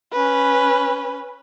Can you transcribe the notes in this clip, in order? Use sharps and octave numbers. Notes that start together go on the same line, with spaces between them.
C#4 B4